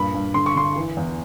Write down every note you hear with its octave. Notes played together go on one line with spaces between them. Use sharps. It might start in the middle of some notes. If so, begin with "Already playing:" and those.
Already playing: G2 A#2 B5
G2
D3 C6
C#6
D3 C6
E3
E2